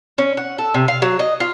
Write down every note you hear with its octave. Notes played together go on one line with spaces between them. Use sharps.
C#4
F#5
A4
C3
F5
F#3
D#5
F4